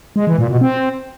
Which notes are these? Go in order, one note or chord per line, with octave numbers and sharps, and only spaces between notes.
G#3
E3
A#2
B2
C4